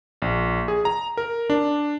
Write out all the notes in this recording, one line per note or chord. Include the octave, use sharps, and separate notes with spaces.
A#1
G#4
A#5
A#4
D4